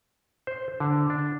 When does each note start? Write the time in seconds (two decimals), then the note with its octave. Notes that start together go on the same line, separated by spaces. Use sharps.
0.47 C5
0.80 D3
1.10 D4